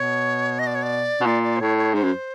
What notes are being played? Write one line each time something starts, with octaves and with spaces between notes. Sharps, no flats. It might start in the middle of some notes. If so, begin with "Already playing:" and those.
Already playing: B2 C#5
D#5
D5
C#5
D5
B2
A#2 D5
D5
C5
A2 C#5
C#5
G#2 C5
F#2